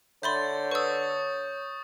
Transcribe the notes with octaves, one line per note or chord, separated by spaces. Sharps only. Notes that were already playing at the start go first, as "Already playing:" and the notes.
D3 C#5 E5 B5 C6 G6 A6
B4 C#6 D#6 E6